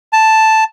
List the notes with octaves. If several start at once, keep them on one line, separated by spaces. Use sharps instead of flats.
A5